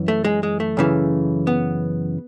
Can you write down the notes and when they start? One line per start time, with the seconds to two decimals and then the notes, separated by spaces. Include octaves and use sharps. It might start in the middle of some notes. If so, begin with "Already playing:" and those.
Already playing: F#2 E3
0.08 A3
0.24 G#3
0.43 G#3
0.60 A3
0.77 F#2 C#3 E3
1.47 B3